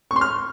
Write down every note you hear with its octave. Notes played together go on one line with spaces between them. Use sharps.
C#6
C6
F6